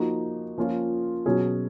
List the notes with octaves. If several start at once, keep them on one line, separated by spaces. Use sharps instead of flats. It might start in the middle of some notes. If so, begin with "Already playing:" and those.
Already playing: F3 A#3 D#4 F#4
F3 A#3 C#4 F4
B2 F#3 C#4 G#4